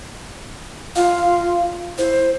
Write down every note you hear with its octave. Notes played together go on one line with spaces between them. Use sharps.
F4 F5
E4 C5